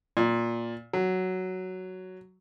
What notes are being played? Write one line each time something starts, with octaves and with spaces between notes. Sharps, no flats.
A#2
F#3